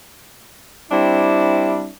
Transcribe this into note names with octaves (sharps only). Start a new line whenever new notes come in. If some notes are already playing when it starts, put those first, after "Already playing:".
G3 C4 D4 E4